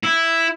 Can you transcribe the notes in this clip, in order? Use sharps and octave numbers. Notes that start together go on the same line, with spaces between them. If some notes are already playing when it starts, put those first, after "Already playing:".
E4